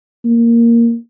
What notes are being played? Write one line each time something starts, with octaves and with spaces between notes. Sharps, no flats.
A#3